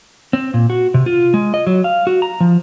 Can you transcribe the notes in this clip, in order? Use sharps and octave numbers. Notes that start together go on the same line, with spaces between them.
C4
A#2
F#4
C3
F4
G#3
D#5
F#3
F5
F#4
A#5
F3